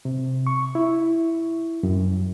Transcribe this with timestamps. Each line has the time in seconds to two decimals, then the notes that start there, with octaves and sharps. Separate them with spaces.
0.05 C3
0.47 C#6
0.75 E4
1.83 F#2